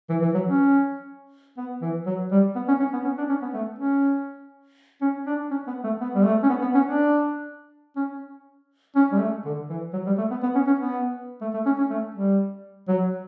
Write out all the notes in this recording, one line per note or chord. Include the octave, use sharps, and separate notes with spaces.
E3
E3
F#3
C#4
B3
E3
F#3
G3
B3
C#4
C#4
B3
C#4
D4
C#4
B3
A3
C#4
C#4
D4
C#4
B3
A3
B3
G3
A3
C#4
B3
B3
C#4
D4
C#4
C#4
G3
A3
D3
E3
F#3
G3
A3
B3
B3
C#4
C#4
B3
A3
A3
C#4
C#4
A3
G3
F#3